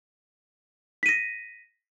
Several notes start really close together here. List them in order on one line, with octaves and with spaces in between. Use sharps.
B6 D#7 A#6